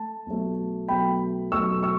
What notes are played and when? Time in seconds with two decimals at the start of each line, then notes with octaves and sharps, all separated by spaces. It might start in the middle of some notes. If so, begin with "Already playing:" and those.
Already playing: A3 A5
0.26 B1 B2 A3
0.88 B1 B2 A3 G5 B5
1.52 B1 B2 A3 C#6 E6
1.83 C#6 E6